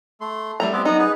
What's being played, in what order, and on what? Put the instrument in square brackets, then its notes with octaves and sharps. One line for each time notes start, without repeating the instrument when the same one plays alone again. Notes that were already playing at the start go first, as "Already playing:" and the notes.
[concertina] A3 C6
[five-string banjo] G3 A3 A#5 [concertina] E4
[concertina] B3 C4 G4
[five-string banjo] F#3 D#4 [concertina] B3 D#5 A#5
[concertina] G#4 B4